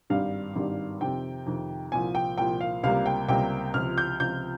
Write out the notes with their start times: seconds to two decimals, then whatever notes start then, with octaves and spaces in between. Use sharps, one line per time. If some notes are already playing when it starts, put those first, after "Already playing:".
0.10 G#1 G2 D#3 G3 F5
0.56 G#1 G2 D#3 G3
1.01 F2 C3 D#3 G5
1.46 F2 C3 D#3
1.92 C2 A#2 F3 G#5
2.15 G5
2.38 C2 A#2 F3 G5
2.61 F5
2.83 C#2 C3 G3 A#3 F5
3.06 G5
3.29 C#2 C3 G3 A#3 G5
3.74 C#2 C3 F3 F6
3.98 G6
4.20 C#2 C3 F3 G6